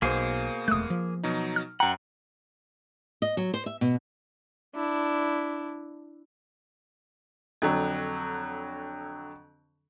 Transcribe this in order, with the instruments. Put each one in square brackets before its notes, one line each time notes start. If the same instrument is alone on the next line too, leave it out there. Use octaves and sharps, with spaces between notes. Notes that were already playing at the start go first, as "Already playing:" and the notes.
[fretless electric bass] B1 [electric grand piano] B2 C5 [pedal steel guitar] A#3 G#4
[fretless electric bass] E1 A3 [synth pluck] D#6 F#6
[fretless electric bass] F3
[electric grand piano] B2 F#3 D#4
[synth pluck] F6
[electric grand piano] F#2 G5 [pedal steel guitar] F#5 [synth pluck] A#5
[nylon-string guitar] D#5
F#3
C5
E5
B2
[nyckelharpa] D4 E4
[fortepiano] F2 D3 F#3